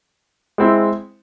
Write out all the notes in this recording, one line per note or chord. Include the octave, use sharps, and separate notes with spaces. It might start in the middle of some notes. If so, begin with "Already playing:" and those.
G#3 C4 E4